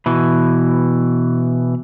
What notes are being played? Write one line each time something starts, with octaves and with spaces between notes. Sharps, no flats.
B2 E3